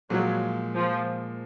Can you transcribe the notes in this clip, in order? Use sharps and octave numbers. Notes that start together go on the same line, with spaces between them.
A#2 F3 F#3 G#3
F3